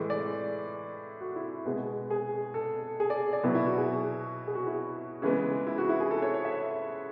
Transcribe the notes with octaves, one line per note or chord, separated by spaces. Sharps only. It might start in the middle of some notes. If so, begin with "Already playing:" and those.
Already playing: A2 E3 G#3
D5
F#4
E4
B2 G#3 B3
G#4
A4
G#4
D5
D5
B2 F#3 B3 E4
E4
F#4
G#4
G#4
F#4
E4
C#3 E3 G#3 B3
E4
F#4
E4
G#4
A4
C#5
C#5
E5